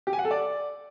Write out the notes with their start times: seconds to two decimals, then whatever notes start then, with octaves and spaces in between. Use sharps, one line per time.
0.07 G4
0.13 G#5
0.19 F#5
0.25 A4
0.31 D5